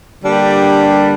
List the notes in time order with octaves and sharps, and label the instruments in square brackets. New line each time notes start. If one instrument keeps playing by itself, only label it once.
[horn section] D3 G3 A#3 D4 G4